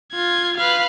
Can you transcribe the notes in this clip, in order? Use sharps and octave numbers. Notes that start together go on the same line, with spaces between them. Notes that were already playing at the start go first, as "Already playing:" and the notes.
F4 G#6
B4 F5